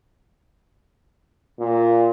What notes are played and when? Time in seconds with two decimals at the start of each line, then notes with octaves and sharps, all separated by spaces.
1.59 A#2